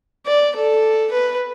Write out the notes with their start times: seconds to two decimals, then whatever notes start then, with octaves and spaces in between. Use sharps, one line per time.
0.26 D5
0.55 A4
1.11 B4